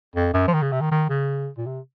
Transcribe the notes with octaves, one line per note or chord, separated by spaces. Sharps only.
F2
F#2
F3
D#3
C#3
C3
D#3
D#3
C#3
A#2
C3